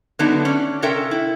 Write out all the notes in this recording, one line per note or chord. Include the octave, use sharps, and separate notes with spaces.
D3 F#3 A3 B3 D4 D#4
C#4 D5
C3 C#4 A4 A#4 E5 G5
E4